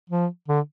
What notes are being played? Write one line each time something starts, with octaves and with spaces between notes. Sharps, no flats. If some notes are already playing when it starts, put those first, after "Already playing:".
F3
D3